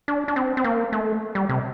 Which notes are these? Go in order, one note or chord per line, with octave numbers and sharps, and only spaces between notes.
D4
D4
C4
C4
A#3
A3
G3
C3